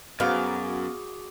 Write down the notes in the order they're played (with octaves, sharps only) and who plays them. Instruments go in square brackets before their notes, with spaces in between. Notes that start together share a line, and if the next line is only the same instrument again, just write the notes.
[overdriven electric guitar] F#2 [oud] B3 [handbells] F#4 G#4 D6 [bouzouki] F5